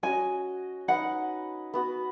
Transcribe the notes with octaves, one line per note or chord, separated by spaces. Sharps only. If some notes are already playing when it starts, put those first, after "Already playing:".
C#4 F#4 D#5 G#5
D#4 B4 D#5 F#5
B3 F#4 B4